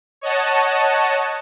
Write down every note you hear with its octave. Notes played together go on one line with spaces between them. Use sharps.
C#5 D#5 F#5 A5